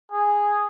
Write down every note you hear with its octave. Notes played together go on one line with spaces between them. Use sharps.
G#4